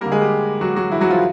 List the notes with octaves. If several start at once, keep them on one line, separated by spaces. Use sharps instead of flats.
D3 G3 A#3 A#4
G#3 G#4
G3 G4
F#3 F#4
F#3 F#4
E3 E4
F#3 F#4
F3 F4